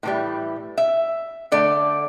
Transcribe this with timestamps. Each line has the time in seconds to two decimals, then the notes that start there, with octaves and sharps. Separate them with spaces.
0.03 A2 E3 G3
0.77 E5
1.52 D3 A3 D5